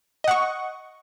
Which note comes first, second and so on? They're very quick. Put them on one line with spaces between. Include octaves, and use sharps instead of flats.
D#5 F#5 C#6